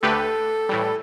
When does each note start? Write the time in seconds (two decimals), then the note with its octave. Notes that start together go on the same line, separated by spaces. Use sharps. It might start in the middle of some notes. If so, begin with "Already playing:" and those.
0.02 D2 D3 A3 G4 A4 B4
0.69 A2 E3 G3